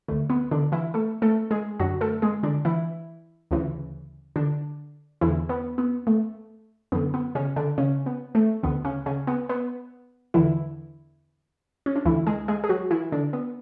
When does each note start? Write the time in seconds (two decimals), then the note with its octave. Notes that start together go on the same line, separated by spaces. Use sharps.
0.08 D2 D3 A3
0.30 B3
0.51 D3 D4
0.72 E3 E4
0.94 A3 A4
1.22 A3 A4
1.51 G#3 G#4
1.80 F#2 D3 F#3 F#4
2.01 A3 A4
2.22 G#3 G#4
2.43 D3 D4
2.65 E3 E4
3.51 D2 C#3 E3
4.36 D3 D4
5.21 E2 D3 E3 E4
5.49 B3
5.78 B3
6.07 A3
6.92 F#2 D3 B3
7.14 B3
7.35 C#3 C#4
7.56 D3 D4
7.78 C#3 C#4
8.06 B3
8.35 A3
8.63 D2 D3 B3
8.85 C#3 C#4
9.06 C#3 C#4
9.27 B3
9.49 B3
10.34 E2 D3 E3 E4
11.86 C#4
11.96 D4
12.05 D2 D3 E3 E4
12.27 G#3 G#4
12.48 G#3 G#4
12.64 G#4
12.69 F#3 F#4
12.91 E3 E4
13.12 D3 D4
13.33 B3